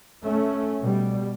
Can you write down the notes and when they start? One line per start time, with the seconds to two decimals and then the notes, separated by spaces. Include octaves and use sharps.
0.23 A3 C#4
0.82 B2 G3